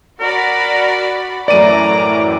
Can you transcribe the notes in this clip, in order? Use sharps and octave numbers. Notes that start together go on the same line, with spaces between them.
F#4 A#4 D5 B5
F#2 A2 E3 D5 A#5 D6 D#7